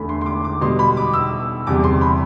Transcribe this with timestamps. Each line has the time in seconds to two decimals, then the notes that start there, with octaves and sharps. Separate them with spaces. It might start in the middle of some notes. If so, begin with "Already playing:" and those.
Already playing: E2 D3 A3 B5
0.09 C6
0.21 C6
0.26 D6
0.44 D6
0.61 B2 G3 C6
0.79 B5
0.97 D6
1.14 E6
1.67 E2 C3 G3 D6
1.84 C6
2.01 B5